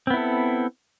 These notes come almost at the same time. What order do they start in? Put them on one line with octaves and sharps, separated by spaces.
C4 B3 E4 A4